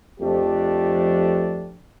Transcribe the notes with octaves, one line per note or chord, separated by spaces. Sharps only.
F2 F3 A3 D4 G4